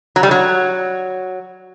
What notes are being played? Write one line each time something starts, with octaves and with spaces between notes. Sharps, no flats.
F#3
G3
F#3